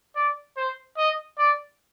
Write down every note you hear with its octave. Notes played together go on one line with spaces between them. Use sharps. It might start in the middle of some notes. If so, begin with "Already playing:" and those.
D5
C5
D#5
D5